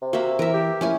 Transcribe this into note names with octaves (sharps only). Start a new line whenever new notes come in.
C3
A#3 F#4 E5
E3 A#4 E5
G4
F3 A#3 C#4 E4 G#5